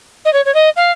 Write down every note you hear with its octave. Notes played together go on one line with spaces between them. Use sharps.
D#5
C#5
C#5
D#5
F5